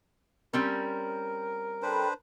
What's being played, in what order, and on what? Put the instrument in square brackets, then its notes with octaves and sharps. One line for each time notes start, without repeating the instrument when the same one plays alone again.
[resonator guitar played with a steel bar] G3 C4 C#4 [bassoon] A#4
[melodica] D4 B4 C5 [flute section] A4 G5 B5